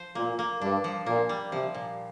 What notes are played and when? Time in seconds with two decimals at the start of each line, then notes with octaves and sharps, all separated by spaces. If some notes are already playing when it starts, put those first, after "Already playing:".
Already playing: F3 C5
0.15 A#2 A#3
0.39 A#3
0.61 G2 D4
0.84 F3
1.06 A#2 A#3
1.29 G3
1.52 C3 F3
1.74 A#2